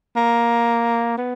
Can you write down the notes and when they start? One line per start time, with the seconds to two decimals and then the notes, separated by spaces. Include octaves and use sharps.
0.16 A#3
1.18 B3